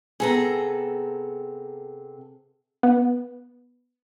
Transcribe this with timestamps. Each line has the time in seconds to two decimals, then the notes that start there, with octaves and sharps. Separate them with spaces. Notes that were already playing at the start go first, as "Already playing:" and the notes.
0.20 C3 B3 G#4 A4 A#5
2.83 B3